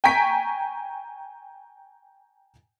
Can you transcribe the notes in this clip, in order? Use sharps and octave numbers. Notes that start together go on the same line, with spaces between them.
G5 G#5 A#5 C#6 B6 D7